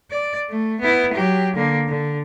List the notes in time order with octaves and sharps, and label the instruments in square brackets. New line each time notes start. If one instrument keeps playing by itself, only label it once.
[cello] D5
A3
B3 E4
F#3 G4
D3 A#3
D3